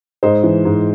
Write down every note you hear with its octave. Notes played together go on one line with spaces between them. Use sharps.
G#2 C5 D#5
E3
G#2